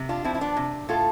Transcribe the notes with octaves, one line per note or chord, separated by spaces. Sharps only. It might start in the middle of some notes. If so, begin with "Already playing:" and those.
Already playing: C3
D4 F4
F3 C4 E4
E4
B3 D4
C3
A2 F4 A4